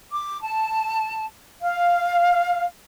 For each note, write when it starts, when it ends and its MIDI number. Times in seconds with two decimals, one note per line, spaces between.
0.12 0.41 86
0.41 1.25 81
1.62 2.65 77